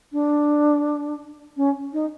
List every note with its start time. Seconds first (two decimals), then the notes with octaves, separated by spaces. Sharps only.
0.12 D4
1.57 C#4
1.93 D#4